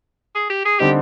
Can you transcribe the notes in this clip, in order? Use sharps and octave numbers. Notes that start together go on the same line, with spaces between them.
G#4
G4
G#4
D3 G3 C4 D#4 G4